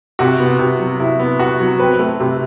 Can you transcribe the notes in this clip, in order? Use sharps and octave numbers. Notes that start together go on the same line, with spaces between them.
C3 F#4
B3
C3
F#3
C3 E4
B3
C3 F#4
F#3
C4 B4
A3
C3